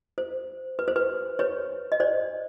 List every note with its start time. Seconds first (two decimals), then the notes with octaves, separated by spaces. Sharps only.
0.18 C5
0.79 B4
0.88 C5
0.96 B4
1.39 B4 C#5
1.92 D#5
2.00 C5 D5